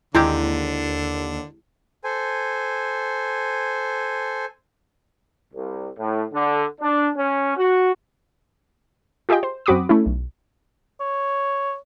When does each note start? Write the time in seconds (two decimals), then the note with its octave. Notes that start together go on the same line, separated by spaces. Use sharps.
0.15 D#2 D3 G#3 C4 E4 G4
2.04 A4 C5 G#5
5.53 C2
5.97 A2
6.33 D3
6.80 D4
7.17 C#4
7.56 F#4
9.29 F4 G4 G#4 D#5 G5
9.43 C5
9.66 F#2 C4 F#4 B5 D6 D#6
9.89 A3 C#4 E4
10.06 B1
11.00 C#5